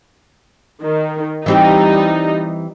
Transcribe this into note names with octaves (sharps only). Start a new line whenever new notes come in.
D#3
E3 G3 C4 D#4 G4